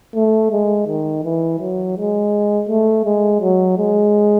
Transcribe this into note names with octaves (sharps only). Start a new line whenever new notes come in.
A3
G#3
D#3
E3
F#3
G#3
A3
G#3
F#3
G#3